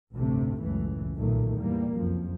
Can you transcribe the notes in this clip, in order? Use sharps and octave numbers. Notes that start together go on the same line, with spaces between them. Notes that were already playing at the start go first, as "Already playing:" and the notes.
A1 D2 G2 C3 A3
F#1 C#2 A2 E3
B1 A#2 D#3 F#3 A3
E2 A2 G3 A#3
F#1 C2 F2 F3